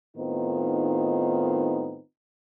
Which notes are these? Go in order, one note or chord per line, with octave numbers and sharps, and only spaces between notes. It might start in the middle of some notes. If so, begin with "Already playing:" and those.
A2 D#3 B3 C4 D#4 F4